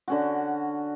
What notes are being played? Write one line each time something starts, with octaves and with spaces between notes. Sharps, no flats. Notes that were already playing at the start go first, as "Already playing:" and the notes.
D3 C#4 F#4